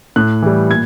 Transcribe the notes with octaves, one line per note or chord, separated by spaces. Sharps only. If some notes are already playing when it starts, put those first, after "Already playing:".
A2 F#6
E3 G3
A#2 G#6